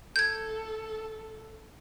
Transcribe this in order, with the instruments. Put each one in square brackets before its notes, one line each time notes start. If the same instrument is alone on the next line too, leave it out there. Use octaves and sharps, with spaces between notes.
[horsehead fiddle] A4 [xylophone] G6 G#6